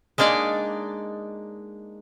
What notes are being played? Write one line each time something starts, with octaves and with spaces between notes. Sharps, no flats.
G#3 A#3 D4 D#4 D5